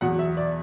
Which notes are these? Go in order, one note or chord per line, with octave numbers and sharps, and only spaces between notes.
E2 B2 F#3 F#5
E5
D5